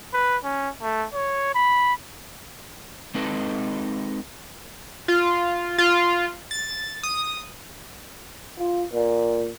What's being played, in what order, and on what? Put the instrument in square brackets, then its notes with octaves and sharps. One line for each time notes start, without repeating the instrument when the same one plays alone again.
[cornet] B4
C#4
A3
C#5
B5
[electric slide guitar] G#3 C4 D#4 A4 B4 D#5
[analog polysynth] F4
F4
A6
D#6
[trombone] F4
A#2